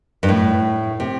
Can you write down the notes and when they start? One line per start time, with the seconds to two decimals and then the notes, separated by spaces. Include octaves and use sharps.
0.23 G2
0.29 A2
1.00 C3